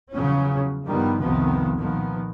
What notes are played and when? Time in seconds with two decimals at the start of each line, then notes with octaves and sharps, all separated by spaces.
0.11 E2 C#3 F3 F#3 C#4
0.87 G2 D#3 F3 G3 B3
1.19 C2 F2 C3 D#3 F3 B3
1.78 A#2 D#3 F3 B3